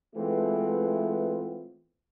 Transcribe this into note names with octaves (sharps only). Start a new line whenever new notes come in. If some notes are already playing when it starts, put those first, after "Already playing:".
E3 G#3 A3 B3 C4 F4